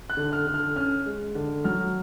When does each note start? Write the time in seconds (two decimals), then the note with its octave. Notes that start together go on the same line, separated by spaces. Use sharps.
0.10 F#6
0.17 D3
0.32 F6
0.47 D3
0.54 F6
0.76 C#4 F6
1.06 G#3
1.35 D3
1.64 F#3 F6